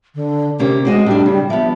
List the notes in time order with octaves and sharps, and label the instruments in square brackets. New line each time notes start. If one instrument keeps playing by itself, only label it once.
[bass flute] D3
[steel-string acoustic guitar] C3 A#3 C#4 [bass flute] G4
[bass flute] G#3 [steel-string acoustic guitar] C4 F#4 D#5
[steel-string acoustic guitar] A2 D4 [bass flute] G3
[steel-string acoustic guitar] C#3
[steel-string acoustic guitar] F3 B3 [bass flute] E5